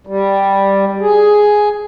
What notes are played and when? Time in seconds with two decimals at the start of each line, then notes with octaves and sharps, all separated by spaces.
0.07 G3
1.01 G#4